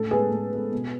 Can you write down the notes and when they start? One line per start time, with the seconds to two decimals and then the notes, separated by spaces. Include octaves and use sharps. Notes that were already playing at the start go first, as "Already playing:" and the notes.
Already playing: A2 A4
0.11 G#3 B3 G#4 B4
0.31 A2
0.52 G#3 B3
0.72 B2